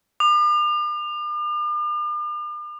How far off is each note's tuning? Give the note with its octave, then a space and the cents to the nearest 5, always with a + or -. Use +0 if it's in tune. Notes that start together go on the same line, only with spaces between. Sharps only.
D6 +45